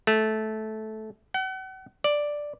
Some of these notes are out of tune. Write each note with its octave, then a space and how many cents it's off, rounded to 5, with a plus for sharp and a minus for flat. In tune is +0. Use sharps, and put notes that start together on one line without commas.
A3 -15
F#5 +40
D5 +5